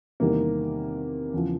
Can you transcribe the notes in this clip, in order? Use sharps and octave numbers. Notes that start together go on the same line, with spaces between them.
E2 C3 D#3 G3 A#3
E2 C#3 F3